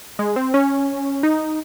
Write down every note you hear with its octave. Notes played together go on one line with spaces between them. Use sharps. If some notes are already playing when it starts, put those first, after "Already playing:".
G#3
C4
C#4
D#4